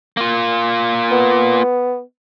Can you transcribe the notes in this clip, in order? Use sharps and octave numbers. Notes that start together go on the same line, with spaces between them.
A#3 F4
B3